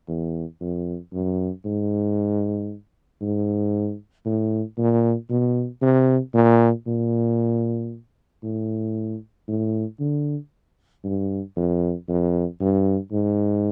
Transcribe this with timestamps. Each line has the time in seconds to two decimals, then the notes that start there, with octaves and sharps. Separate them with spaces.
0.08 E2
0.61 F2
1.13 F#2
1.65 G#2
3.21 G#2
4.26 A2
4.78 A#2
5.30 B2
5.82 C3
6.34 A#2
6.87 A#2
8.44 A2
9.48 A2
10.00 D3
11.04 G2
11.57 F2
12.09 F2
12.61 G2
13.12 G#2